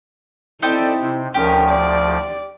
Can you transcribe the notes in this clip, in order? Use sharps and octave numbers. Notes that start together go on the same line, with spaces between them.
C4 D#4 E4 G4 A4 C5 D5
C3
D2 F3 C#4 G4 A#4
D5